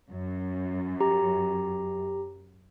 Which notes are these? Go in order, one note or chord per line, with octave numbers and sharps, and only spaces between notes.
F#2
G4 A#5